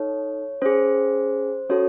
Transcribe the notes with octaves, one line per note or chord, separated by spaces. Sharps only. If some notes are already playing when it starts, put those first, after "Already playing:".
Already playing: D#4 A4 C#5
C#4 G#4 C5
C#4 F#4 A4 C#5